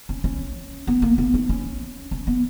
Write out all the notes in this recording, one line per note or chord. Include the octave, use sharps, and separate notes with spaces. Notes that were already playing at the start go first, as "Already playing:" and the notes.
C#4
C#4
B3
A#3
B3
D#4
C#4
C#4
B3